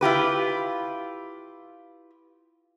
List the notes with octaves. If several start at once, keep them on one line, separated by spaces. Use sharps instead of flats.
E4 F4 G4 B4